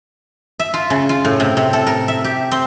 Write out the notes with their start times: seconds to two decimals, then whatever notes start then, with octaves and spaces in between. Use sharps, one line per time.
0.60 E5
0.74 F4
0.90 C#3
1.09 F4
1.25 A2
1.40 C3
1.57 C3
1.73 A4
1.87 A#4
2.08 E5
2.24 G4
2.52 C4